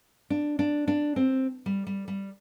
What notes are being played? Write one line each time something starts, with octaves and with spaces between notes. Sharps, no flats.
D4
D4
D4
C4
G3
G3
G3